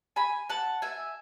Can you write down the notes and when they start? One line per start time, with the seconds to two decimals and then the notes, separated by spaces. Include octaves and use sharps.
0.16 G#5 B5
0.49 F#5 A5
0.82 E5 G#5